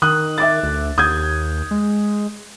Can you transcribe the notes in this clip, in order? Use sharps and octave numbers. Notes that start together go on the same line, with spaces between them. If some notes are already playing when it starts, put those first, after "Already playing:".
D#3 D#6 F#6
E5 D6 A6
D2
D#2 D#6 G6 G#6
G#3